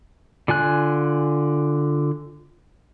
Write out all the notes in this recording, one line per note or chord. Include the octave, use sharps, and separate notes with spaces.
D3 F4 G#5 F#6